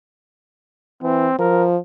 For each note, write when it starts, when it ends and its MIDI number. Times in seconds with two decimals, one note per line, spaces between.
1.03 1.27 52
1.03 1.36 60
1.39 1.77 53
1.39 1.67 70